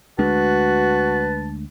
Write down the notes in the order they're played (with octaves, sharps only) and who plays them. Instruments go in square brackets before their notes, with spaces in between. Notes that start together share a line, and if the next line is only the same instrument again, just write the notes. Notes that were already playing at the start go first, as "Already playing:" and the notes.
[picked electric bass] D2 G#3 D4 [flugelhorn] F#4 [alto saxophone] B4 [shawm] A5